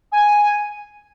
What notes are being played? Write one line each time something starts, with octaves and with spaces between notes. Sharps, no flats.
G#5